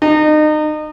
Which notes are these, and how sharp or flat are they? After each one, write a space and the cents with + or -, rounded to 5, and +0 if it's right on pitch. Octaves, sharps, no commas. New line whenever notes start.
D#4 -30